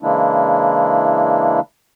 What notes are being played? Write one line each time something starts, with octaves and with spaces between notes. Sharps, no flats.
C#3 E3 G#3 A#3 D4 E4